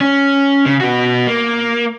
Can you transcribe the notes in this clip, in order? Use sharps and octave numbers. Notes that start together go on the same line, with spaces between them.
C#4
C#3
B2 F#4
A#3